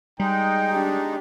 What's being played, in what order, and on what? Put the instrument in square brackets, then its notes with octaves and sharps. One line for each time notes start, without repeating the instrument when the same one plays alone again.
[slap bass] G3 [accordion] G#3 D#4 [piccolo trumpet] G5
[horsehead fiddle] D4 G4